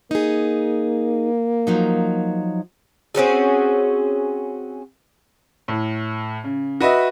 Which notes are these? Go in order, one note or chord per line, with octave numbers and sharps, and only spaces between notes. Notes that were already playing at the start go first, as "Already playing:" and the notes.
A#3 D#4 G#4
F3 F#3 D#4
C4 C#4 F#4 G#4
A2
C#3
F#4 B4 D#5 E5